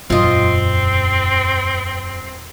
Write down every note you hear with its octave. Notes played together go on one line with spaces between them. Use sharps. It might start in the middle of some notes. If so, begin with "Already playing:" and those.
E1 F#2 A#2 C4 D4 F4 D#5